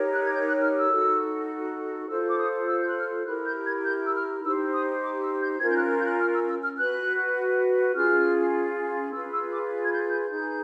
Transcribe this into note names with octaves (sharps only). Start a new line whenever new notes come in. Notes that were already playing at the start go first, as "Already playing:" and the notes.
Already playing: D#4 G4 A#4 C#5
F#6
G#6
G6
F#6
F6
E6
D#4 F#4 A4
F4 A4 C5 E6
D6
D#6
E6
G6
F#6
F6
E4 G4 A#4 F#6
G6
G#6
G6
E6
F6
D#4 G4 C5 E6
D#6
D6
E6
G6
C#4 F4 A#4 G#6
G6
F#6
G6
F#6
F6
E6
E6
F6
F#4 B4 F#6
C#4 F4 G#4 F6
F4 G#4 B4 E6
E6
D6
G#6
G6
G6
D#4 G#4 B4 G6